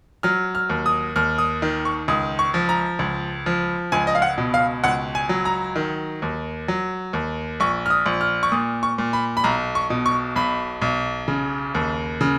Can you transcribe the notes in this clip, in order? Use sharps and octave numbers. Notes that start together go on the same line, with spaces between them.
F#3 F6
F6
D#2
D#6
D#2 F6
D#6
D#3
C#6
C#2 D#6
C#6
F3
A#5
C#2
F3
C#2 G#5
D#5
F5
F#5
B2
F5
C#2 F#5
G#5
F#3
A#5
D#3
D#2
F#3
D#2
A#1 C#6
F6
D#6
A#1
F6
C#6
A#2 D#6
C#6
A#2
B5
B5
B1 A#5
C#6
B2
C#6
B1 B5
B1
C#3
D#2
C#3